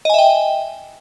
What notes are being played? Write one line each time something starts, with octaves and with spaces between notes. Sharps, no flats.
D#5 E5 G5 G#5